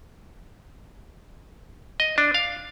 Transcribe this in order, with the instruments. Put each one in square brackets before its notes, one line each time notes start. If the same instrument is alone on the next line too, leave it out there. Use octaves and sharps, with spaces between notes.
[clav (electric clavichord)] D#5
D4
F5